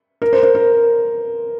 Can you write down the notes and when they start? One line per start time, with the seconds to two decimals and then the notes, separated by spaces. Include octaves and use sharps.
0.22 A#4
0.33 C5
0.43 C5
0.55 A#4